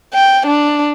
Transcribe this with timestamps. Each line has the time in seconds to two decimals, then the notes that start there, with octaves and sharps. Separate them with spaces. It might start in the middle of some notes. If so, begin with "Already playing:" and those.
0.14 G5
0.47 D4